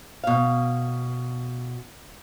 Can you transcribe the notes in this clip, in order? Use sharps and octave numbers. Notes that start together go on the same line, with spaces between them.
B2 F5